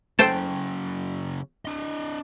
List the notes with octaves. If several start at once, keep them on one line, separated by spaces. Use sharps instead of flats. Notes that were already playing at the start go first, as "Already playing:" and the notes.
C#3 F#3 A4 C5 G5
D4 D#5